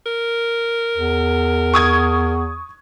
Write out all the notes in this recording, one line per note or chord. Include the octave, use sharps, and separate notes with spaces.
A#4
E2
C#6 D#6 G#6